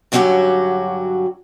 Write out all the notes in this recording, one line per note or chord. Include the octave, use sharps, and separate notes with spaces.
G2 D3 F#3 C#4 F#4 G4